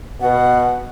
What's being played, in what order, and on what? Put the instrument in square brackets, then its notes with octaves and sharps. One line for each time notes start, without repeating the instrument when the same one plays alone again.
[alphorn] B2 [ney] F#5